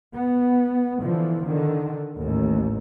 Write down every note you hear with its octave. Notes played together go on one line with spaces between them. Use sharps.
B3
D3 E3 F3
D3 D#3
A1 D#2